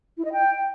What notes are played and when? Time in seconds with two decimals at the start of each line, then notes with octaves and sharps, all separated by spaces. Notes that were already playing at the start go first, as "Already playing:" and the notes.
0.17 E4
0.24 D#5
0.32 G5